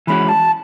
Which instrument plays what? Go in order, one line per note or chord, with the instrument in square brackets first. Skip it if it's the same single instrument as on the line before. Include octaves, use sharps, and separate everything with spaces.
[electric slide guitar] E3 G#3 C#4 F#4 [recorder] B5
[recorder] A5